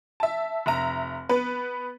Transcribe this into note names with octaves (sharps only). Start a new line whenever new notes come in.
E5 A5
F1 E5 A#5
B3 B4